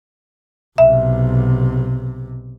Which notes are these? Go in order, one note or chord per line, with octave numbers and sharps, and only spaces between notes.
B1 C3 E5